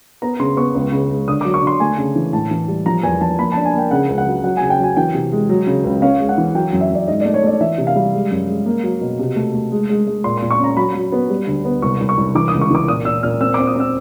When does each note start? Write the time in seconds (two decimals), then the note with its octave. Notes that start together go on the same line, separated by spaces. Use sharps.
0.22 B3 A#5
0.40 C#3 C6
0.57 B3 C#6
0.75 C#2
0.92 C#3
1.10 G#3
1.28 D3 D#6
1.41 F#3 D6
1.54 C#6
1.62 D3 C6
1.80 A3 G#5
1.98 C#3
2.16 E3
2.33 A2 A5
2.51 E3
2.68 G3
2.86 F3 A#5
3.03 E2 G#5
3.21 F3 A5
3.38 A#3 B5
3.52 A5
3.57 D4
3.65 G#5
3.74 A#3 G5
3.91 C#3 F#5
4.09 C#2
4.18 F#5
4.26 F#3
4.44 F#3 F#5
4.57 G#5
4.62 C#3
4.70 G5
4.79 F#3 G#5
4.96 E3 G5
5.14 C3
5.32 G#3
5.49 F#3
5.67 C#3
5.84 C#2
6.02 C#4 F5
6.20 G#3
6.29 F#5
6.38 E3
6.55 F#3 G5
6.73 F#2
6.81 E5
6.90 F#2 D5
7.08 G#2 D#5
7.21 A3 D5
7.34 C#5
7.43 A3 D5
7.61 E3 E5
7.78 C3
7.87 F5
7.96 G3
8.13 G#3
8.31 F#2
8.48 G#3
8.66 A#3
8.83 F#3
9.01 B2
9.19 C3
9.36 A3
9.54 A3
9.71 G#3
9.89 G#3
10.07 G#3
10.24 A#2 C6
10.37 C6
10.42 A#2
10.51 C#6
10.59 C#4 A#5
10.77 F#3 B5
10.95 F#3
11.12 B3
11.30 G3
11.47 D2
11.65 B3
11.82 C2 C#6
12.00 C2
12.09 C#6
12.17 C2
12.35 E3 D6
12.48 D#6
12.53 C#2
12.61 C#6
12.70 E3 D6
12.88 A#2 D#6
13.05 A#2 E6
13.23 A#2 F6
13.41 C4 E6
13.54 C4 D6
13.67 D#6
13.76 C4 E6